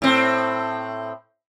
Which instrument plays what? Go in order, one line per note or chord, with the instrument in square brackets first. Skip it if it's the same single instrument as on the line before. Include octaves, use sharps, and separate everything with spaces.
[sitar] A2 C4